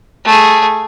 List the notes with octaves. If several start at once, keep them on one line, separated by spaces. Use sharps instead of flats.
A3 G#4